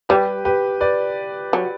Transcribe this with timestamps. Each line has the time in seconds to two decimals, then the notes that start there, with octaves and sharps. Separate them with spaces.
0.09 G3 G4 B4
0.45 G4 B4
0.81 B4 D5
1.53 F#3